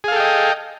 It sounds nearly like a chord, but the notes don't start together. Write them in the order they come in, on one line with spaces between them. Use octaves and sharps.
G#4 F5 A4 G5 D#5